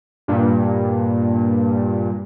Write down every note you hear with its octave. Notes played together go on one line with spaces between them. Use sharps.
G2 A#2